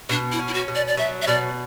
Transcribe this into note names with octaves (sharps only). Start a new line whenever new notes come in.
B2 D4
E4
C#4
E4
F#4
B2
D5
D5
F#3 E5
E5
B2 D5